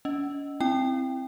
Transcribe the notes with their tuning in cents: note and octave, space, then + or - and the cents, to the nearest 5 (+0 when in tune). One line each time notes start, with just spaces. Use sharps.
C#4 +40 D#5 +0
C4 +0 E4 +0 G5 +10